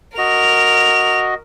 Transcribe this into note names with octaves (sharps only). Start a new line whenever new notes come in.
F#4 A#4 D#5 F7